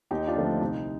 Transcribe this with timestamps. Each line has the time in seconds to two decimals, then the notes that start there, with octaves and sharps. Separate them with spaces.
0.11 D#2 D#4 G4
0.27 D4 F4
0.35 D3 F3 A3 C4
0.44 D4
0.61 C2 D#4